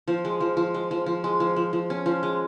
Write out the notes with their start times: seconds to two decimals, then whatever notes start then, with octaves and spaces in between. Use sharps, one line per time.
0.08 F3
0.25 G#3
0.41 F3
0.57 F3
0.74 G#3
0.91 F3
1.06 F3
1.24 G#3
1.40 F3
1.56 F3
1.73 F3
1.90 C#4
2.06 F3
2.23 G#3